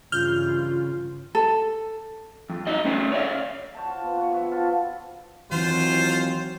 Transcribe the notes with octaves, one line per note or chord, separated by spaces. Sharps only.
G2 C#3 E3 F4 F6 G6
A4
F2
D#4 F#4 D#5
A3 C#4 C5
C#5 D5 E5 F5
F#4 C5 A5
F4
B3
F#4 B4 C#5
F3 F#4 E5
F4 F#4 A4 E5
D#2 E3 F#3 C4 F4 C5